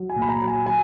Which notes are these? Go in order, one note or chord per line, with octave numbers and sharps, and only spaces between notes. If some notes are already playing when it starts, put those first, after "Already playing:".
Already playing: F#3
G#5
A#2
B5
A#5
F#3
G#5
F#3 G#5